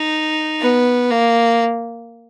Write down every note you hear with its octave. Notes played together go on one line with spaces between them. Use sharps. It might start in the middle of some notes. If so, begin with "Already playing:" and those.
Already playing: D#4
B3
A#3